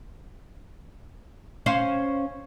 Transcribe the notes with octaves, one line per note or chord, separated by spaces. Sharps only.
C#4 C5 F5